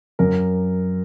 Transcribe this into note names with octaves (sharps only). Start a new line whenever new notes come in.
F#2 A#4